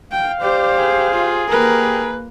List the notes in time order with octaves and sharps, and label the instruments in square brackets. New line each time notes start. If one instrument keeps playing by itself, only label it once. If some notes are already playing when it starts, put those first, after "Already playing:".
[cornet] F5 [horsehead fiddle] G5
[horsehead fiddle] G4 C5 [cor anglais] D5
[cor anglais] G#4
[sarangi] F4
[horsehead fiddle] A#3 B4 [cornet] G4 [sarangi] A#4